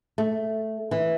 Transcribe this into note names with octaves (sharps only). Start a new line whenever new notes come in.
A3
E3